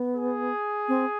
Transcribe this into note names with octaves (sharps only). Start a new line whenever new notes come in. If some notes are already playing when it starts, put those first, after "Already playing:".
Already playing: B3
G#4
C4